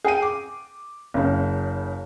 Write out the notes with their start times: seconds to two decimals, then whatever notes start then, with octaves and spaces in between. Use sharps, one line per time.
0.05 G#4 G5 D#7
0.22 D6
1.14 F#1 C#3